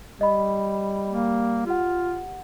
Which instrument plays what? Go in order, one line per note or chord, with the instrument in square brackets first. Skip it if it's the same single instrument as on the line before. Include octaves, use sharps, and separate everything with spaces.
[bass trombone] G3 [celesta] D#5 B5
[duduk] A#3
[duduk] F4 [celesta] G4 F#5